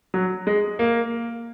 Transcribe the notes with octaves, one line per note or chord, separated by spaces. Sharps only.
F#3
G#3
A#3